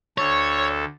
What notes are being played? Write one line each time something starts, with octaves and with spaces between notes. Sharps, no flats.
D2 A4 C#5